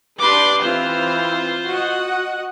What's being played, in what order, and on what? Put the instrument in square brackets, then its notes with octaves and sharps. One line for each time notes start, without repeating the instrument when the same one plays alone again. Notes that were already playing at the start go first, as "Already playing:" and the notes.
[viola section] D4 G4 B4 [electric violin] C6 D6
[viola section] E3 C4 [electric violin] F4 C5
[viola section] F#4 D#5 F#5